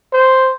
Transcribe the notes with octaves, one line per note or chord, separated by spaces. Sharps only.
C5